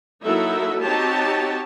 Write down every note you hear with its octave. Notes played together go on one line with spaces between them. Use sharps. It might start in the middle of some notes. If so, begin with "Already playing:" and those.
F#3 A#3 D#4 E4 A4 E5
C4 D#4 F#4 G4 C#5 A5